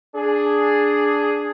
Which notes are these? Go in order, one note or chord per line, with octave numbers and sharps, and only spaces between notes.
D4 G#4